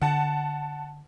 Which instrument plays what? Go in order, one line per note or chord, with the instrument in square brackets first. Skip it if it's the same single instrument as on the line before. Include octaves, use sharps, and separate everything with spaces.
[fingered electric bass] D3 [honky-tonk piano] F#5 A5